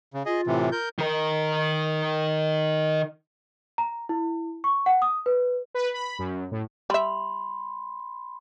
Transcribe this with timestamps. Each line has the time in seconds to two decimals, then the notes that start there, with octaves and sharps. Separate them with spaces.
0.14 C#3
0.26 F4 G#4 D#5
0.47 A2 C3 E3
0.72 A#4 G6
0.99 D#3 A#4
3.78 A#5
4.09 E4
4.64 C#6
4.86 F#5
5.02 D#6
5.26 B4
5.74 B4
5.94 B5
6.19 F#2
6.51 A2
6.90 G3 E5 B5 C6